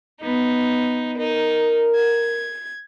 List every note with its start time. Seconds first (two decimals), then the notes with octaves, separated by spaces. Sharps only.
0.21 B3 D#4
1.17 D#4 A#4
1.96 G#6